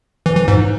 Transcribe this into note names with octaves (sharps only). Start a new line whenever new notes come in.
E3
E3
G#2